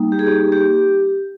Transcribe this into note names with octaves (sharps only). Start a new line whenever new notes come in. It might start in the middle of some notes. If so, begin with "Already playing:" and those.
Already playing: G3 A#3 D#4
G4
G#4
G4
G4